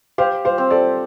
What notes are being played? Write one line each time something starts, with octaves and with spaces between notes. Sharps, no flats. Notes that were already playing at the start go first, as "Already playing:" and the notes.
G4 C5 F5
C5 F5
C4
A4 D5